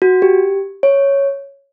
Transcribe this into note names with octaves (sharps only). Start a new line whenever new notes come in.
F#4
G4
C#5